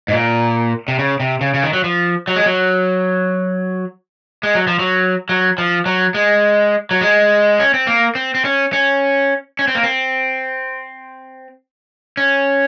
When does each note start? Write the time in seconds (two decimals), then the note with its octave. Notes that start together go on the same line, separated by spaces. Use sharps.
0.08 G#2
0.12 A#2
0.88 C3
0.99 C#3
1.20 C3
1.41 C#3
1.54 C#3
1.63 D#3
1.73 F#3
1.84 F3
2.28 F#3
2.36 G#3
2.46 F#3
4.43 G#3
4.55 F#3
4.67 F3
4.79 F#3
5.29 F#3
5.58 F3
5.86 F#3
6.14 G#3
6.91 F#3
7.01 G#3
7.60 C#4
7.74 C4
7.87 A#3
8.15 C4
8.35 C4
8.45 C#4
8.73 C#4
9.59 C#4
9.68 C4
9.75 A#3
9.83 C4
12.17 C#4